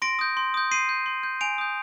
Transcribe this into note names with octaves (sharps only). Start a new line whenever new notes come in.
C6 A#6 D7
D#6 G6
C6
D#6 G6
C6 C7 D#7
G6
C6
G6
G#5 D7 F7
D#6 G6